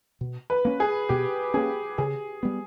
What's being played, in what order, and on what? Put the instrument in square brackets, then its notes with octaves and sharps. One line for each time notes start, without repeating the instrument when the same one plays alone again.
[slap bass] B2
[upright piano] B4
[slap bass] A#3 C#4
[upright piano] G#4
[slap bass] B2 [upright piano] G4
[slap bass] A#3 C#4 [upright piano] G#4
[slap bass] C#3 [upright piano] G#4
[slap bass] G3 B3